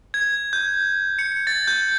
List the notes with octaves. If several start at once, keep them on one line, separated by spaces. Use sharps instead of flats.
G#6
G6
C#7
A6
G6